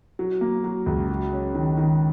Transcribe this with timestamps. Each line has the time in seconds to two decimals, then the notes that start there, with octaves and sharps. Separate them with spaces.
0.19 F#3
0.41 A#3
0.64 F#3
0.86 C#2
1.09 F#3
1.33 C#4
1.55 D#3
1.77 D#3